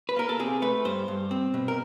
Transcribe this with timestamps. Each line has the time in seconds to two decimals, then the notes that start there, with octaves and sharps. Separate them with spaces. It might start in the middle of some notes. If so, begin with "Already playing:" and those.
0.09 B4
0.16 A#3 A#4
0.29 A4
0.40 C3 G#4
0.62 A3 B4
0.85 G2 C5
1.08 G2
1.31 C4
1.54 B2
1.68 A#4